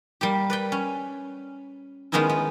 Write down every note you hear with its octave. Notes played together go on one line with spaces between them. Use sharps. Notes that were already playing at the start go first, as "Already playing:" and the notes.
G3 A#3 G4
B4 D5 G5
C#4
D#3 G#3 B3 C#4 D#4 E4
B3